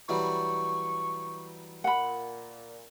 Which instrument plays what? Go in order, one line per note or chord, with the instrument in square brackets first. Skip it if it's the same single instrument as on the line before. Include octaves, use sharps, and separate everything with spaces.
[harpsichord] E3 F#3 G3 [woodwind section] C#6
[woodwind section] A#2 [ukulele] F#5 B5